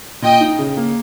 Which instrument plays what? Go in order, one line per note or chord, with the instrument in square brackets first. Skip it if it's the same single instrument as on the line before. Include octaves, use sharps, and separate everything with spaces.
[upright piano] A#2 [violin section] D#5 G5
[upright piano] D#4
C#3
A#3